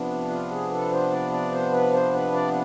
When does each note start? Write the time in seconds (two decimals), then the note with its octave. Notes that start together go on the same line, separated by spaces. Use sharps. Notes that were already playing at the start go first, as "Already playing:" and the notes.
Already playing: C3 F3 B3 D4
0.29 F4
0.51 G#4
0.71 A4
0.91 C5
1.11 D5
1.32 D5
1.51 C5
1.72 B4
1.93 C5
2.14 B4
2.33 D5